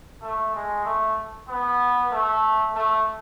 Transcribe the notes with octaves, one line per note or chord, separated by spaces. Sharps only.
A3
G#3
A3
B3
A3
A3